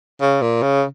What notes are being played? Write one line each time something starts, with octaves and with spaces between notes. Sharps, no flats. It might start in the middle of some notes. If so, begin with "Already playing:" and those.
C#3
A#2
C#3